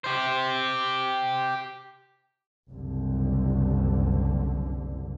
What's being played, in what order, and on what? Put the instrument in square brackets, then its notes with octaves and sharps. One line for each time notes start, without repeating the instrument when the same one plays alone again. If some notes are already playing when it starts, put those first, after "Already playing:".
[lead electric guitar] G4 C5
[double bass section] F#1 C2 D3